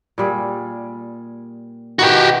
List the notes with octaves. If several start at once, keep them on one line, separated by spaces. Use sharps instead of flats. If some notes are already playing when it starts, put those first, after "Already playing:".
A#2 G3 G#4
B2 D#3 E3 F#4 G4